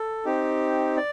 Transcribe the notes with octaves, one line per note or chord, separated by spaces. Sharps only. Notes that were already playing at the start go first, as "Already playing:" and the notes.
Already playing: A4
C4 D#4 G4
D5